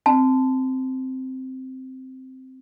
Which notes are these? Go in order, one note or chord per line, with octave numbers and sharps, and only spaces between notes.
C4 A5